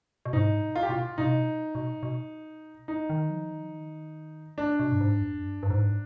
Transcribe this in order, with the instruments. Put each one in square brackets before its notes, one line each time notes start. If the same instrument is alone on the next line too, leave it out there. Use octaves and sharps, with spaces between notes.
[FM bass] B2
[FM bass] G#2 [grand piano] D#4
[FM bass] B2
[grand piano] F4
G4
[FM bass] B2 [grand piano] F4
[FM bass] B2 [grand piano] D#4
[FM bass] C3
B2
B2
B2
[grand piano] D#4
[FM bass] D#3
F3
D#3
F3
D#3
[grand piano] D4
[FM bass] B2
G2
G#2
F2
G2
G2
G#2